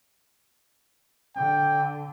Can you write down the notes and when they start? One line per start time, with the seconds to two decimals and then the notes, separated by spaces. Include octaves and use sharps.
1.37 D3 G5